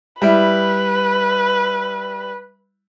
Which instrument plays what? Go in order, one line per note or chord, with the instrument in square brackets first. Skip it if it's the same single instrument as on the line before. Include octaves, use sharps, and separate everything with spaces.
[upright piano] G3 E4 [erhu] B4